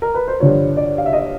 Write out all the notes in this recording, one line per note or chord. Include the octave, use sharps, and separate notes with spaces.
A#4
B4
C5
G2 D3 F3 C#5
D5
F5
E5
D#5